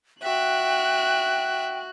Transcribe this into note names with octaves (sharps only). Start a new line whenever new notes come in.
F#4 E5 G5 F#6